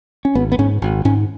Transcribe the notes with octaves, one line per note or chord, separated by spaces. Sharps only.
C#4
G#1 B3
B3
G#2 C#4
G#1
G#2 C#4